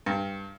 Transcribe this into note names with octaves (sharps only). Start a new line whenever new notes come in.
G2